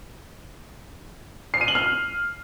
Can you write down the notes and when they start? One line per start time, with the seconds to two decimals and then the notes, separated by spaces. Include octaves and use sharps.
1.54 C7
1.61 D#7
1.68 F#7
1.75 F6